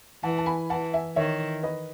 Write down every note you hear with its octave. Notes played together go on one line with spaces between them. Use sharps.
E3 F#5 A5
A5
G#5 B5
E3 F#5 A5
E5 G#5
D#3 C#5 E5
B4 D#5